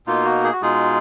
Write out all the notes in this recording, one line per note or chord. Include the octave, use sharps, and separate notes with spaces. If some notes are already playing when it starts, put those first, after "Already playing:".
B2 A#3 D#4 F4
F#4
G#4
F#4
B2 G#3 D#4 F4 G#4